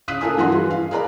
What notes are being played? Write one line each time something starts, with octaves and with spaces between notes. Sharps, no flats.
C#3 F5 D#6 F#6 B6 D#7
F4 A4 A#4 G#5 D#6
G2 E3 F#4 B4 C6
E3 G#4
F5
G#4 A#4 B4 D5 A#5 B5